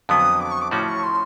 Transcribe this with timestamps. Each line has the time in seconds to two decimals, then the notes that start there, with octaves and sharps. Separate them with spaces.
0.09 F2 D3 F#3 B3 D#6
0.40 D6
0.51 C#6
0.61 D6
0.71 A2 F3 A3 C#4 F#4 D6
0.88 C#6
1.03 C6